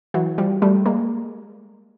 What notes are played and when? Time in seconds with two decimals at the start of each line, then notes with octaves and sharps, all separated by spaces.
0.14 E3 F#3
0.38 F3 G3
0.62 G3 A3
0.86 G#3 A#3